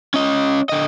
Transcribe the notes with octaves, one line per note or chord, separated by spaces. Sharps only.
C#4 D#5
D3 D#5